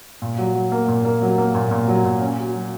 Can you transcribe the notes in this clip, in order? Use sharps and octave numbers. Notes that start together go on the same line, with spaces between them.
A#2
F#3
F#3
A#3
A#2
A#3
F#3
A#3
A#2
A#2
F#3
A#2
C#4
F#4
F#3